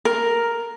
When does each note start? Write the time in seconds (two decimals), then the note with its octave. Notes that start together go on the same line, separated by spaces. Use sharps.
0.05 A#4